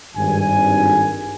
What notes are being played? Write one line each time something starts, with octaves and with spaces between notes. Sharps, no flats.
G#1 G2 G#5